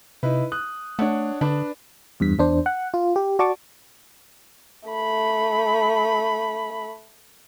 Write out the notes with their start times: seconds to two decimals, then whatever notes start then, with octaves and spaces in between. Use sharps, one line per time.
0.23 C3 D#4 E4 B4
0.52 D#6 F#6
0.99 A3 D4 C#5 F#5
1.41 D3 D4 B4 A5
2.20 E2 G2 B6
2.39 E2 D4 C5
2.66 F#5
2.94 F4
3.16 G4
3.39 F#4 D5 A5 C#6 D6
4.88 A3 B5